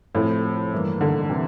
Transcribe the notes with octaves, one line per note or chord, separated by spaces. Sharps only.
A2 C3 F3 C4
G2 E3 A#3
D3
C3 E3